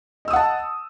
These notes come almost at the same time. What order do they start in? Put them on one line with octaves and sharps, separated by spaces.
D#5 E6 D#6 F#5 A5